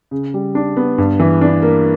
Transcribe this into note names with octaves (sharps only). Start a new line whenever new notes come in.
C#3
G3
D4
B3
G2
E3
D4
A#3